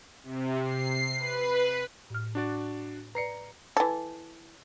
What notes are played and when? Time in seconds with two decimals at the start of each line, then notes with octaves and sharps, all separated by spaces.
0.23 C3
0.62 C7
1.19 B4
2.10 A2 F6
2.35 D4 F#4 D5
3.15 B4 D5 A#5 C7 C#7
3.77 E3 A4